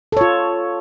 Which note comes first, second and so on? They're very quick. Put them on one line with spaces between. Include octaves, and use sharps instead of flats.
A4 C#5 F4